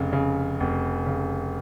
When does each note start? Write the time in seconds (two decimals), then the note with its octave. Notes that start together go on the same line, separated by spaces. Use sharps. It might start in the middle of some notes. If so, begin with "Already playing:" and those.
Already playing: F1 C#3
0.13 C#3
0.60 F1
1.06 C#3